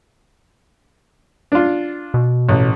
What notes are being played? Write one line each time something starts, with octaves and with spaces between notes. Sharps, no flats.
D4 F4
B2
A1